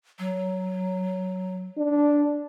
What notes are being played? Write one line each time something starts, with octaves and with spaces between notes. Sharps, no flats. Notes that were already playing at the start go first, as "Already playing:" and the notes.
F#3
D4